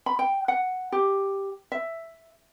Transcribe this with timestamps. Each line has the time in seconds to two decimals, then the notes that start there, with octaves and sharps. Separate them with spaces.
0.06 B5
0.19 G5
0.48 F#5
0.92 G4
1.72 E5